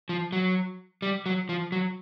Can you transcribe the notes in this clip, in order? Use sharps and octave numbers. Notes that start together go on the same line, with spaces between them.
F3
F#3
G3
F#3
F3
F#3